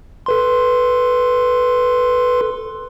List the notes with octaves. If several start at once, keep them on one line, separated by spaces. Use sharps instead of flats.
A4 B4 C6